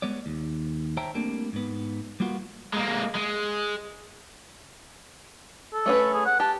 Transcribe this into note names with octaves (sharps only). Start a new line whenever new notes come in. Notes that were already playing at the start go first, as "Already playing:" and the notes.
G#3 B3 C#5 D5
D#2
C5 C#5 E5 G5 A5 A#5
G3 A3 A#3 C4 D4
G#2 B3
G3 A#3 B3 F4 F#4
G#3 A#3
G#3
A4
A3 C#4 B4
G#4
F#5
G4 A5